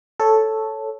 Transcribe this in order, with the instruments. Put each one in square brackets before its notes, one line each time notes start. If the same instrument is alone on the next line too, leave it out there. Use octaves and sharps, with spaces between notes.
[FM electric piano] A4 C#5